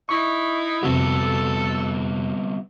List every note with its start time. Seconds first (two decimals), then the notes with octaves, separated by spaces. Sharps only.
0.09 D#4 E4 C#6
0.83 F2 C3 G3 B3 C4 F#4 A4